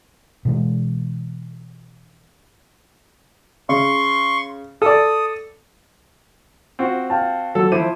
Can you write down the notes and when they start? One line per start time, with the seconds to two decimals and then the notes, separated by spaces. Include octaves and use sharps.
0.45 B2 E3 G#3
3.69 C#3 C6 C#6
4.82 A4 D5 D#6
6.79 C4 F4 F#4
7.10 F5 G5 A5
7.55 F#3 A4 E6
7.72 F3 E4 C5 D6 D#7